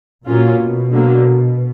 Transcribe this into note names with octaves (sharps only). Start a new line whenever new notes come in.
A#2 F#3 A#3 C#4 F4
B2
D3 F#3 A#3